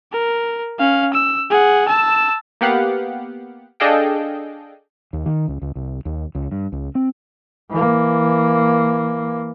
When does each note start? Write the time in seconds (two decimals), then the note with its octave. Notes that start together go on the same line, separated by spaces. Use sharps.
0.12 A#4
0.79 C#4 F5
1.13 E6
1.50 G#4 F#5
1.88 A5 E6
2.61 A#3 B3 G4 F5 F#5
3.80 D4 G#4 A4 D#5 F5 G5
5.13 D#2
5.26 D#3
5.48 C#2
5.62 C#2
5.76 C2
6.05 D#2
6.35 C#2
6.52 G2
6.72 C#2
6.95 C4
7.71 E3 A#3